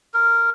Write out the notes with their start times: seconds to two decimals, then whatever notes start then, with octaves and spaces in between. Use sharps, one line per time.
0.14 A#4